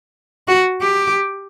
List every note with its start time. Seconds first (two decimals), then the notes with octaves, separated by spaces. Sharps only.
0.48 F#4
0.81 G4